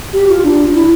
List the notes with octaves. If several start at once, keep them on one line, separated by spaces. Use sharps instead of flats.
G4
F4
D4
E4